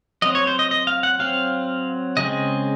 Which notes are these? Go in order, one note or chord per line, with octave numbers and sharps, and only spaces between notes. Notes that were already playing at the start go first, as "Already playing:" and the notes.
F#3 C4 D#5
C#5
C5
D#5
D#5
F5
F#5
F#3 C4 F5
C#3 G#3 C4 D#5